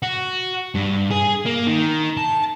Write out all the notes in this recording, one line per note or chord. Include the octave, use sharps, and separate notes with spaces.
F#4
G2
G#4
A#3
D#3
A5